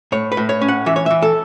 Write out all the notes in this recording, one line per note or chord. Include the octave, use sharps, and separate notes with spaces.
A2 C#5
B4
A2
C#5
C#4
F#5
E3 E5
C#5
E3 E5
A4